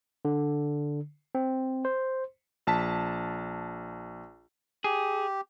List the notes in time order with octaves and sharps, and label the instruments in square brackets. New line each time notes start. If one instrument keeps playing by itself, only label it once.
[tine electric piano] D3
C4
C5
[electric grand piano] A#1 A5 B6
[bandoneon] G4 [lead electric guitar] G#4